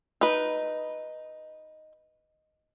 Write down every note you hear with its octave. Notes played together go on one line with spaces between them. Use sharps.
D#4 B4